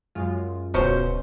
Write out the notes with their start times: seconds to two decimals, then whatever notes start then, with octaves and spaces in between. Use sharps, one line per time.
0.15 F#2 G#3 F4
0.74 D1 B2 F#3 C#4 C5